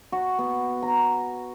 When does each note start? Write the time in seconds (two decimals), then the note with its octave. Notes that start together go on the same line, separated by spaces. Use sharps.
0.12 F#4
0.39 B3
0.82 A#5